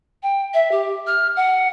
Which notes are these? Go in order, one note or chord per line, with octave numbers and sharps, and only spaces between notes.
G5
E5
G4
F6
F#5